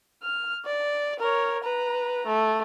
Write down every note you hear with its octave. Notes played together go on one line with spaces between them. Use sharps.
F6
D5
A#4 C#5
B4 A#5
A3